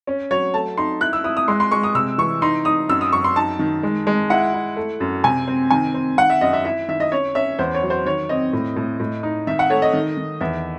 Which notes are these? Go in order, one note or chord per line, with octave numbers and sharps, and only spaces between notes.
C#4
F#3 C#5
A3 A5
D#4 C6
E4 F#6
E6
E4 D#6
D#6
G#3 C6
C6
G#3 C#6
D#6
C3 E6
E3 C#6
D#4 C6
D#4 D#6
F#2 E6
D#6
F#2 C#6
C6
D#4 A5
D#3
G#3
G#3
E4 F#5
E4
A3
F#2
C3 G#5
C4
D#3 G#5
C4
D#3 F#5
E5
F#2 D#5
E5
E4 E5
D#3 E5
D#5
C#4 C#5
C#4 E5
E2 C5
C#5
F#3
C5
D#3 C#5
C4 D#5
A2
A2
A2
D#4
D#3 E5
F#5
A3 C#5
D#5
D#3
D#3
E2 E5